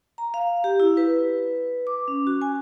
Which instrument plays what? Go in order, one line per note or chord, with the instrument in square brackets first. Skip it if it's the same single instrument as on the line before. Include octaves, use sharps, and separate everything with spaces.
[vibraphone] A#5
F5
G4
E4
B4
D6
C#4
F#4
G#5